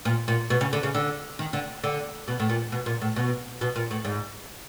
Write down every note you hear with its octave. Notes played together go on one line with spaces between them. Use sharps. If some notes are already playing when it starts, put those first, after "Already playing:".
A#2
A#2
B2
C#3
D3
C#3
D3
D#3
D3
D3
B2
A2
A#2
B2
A#2
A2
B2
B2
A#2
A2
G#2